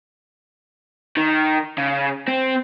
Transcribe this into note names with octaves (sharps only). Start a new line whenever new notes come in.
D#3
C#3
C4